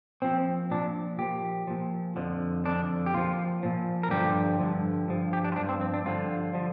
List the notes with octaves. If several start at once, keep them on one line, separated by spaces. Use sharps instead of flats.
A#2 F3 C4
A#2 F3 D4
A#2 F3 G4
A#2 F3
F2 D3 F3
F2 D3 F3 D4
G4
A#2 F3 F4
A#2 F3
A#4
G2 D3 F3 G4
G2 D3 F3
G2 F3
G4
D4
F4
G2 F3 D4
C4
C4
D4
G2 D3 F3 F4
D3 F3